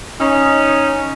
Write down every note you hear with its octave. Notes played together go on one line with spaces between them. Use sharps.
C#4 D#4